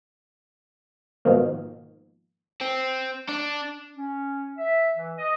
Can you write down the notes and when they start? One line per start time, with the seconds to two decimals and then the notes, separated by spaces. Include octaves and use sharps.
1.25 G#2 B2 D#3 F3 A#3
2.61 C4
3.29 D4
3.96 C#4
4.58 E5
4.97 E3
5.18 D#5